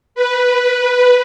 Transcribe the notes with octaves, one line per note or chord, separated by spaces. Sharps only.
B4